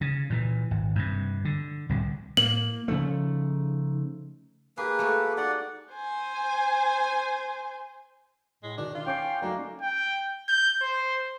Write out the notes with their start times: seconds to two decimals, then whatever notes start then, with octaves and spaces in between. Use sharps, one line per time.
0.01 C#3
0.30 A#2 E3
0.71 G#1
0.95 G2 C3
1.45 D3
1.89 D1 C2 D3
2.37 A2 A#3 F#7
2.88 C#3 F3 A3 D#4
4.78 A#3 G4 G#4 B4
4.99 A3 F#4 G4
5.37 D#4 D5 F#5
5.94 C5 G#5
8.63 A2 G#3
8.78 B2 D#3 D4
8.95 D4 F4
9.07 C#4 C#5 G5 D6 C7
9.42 F#3 A3 A#3 D4 D#4
9.82 G5
10.48 G6
10.82 C5